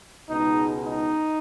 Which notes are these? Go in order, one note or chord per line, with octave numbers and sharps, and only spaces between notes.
C#2 B2 G#3 D#4
D#4